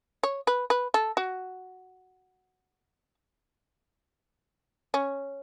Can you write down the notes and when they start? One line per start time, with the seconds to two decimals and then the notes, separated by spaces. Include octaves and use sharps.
0.23 C#5
0.47 B4
0.70 B4
0.94 A4
1.17 F#4
4.94 C#4